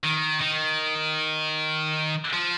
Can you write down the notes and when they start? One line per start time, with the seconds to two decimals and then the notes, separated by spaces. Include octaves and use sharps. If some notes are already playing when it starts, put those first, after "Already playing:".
0.03 D#3
0.41 D#3
2.33 F3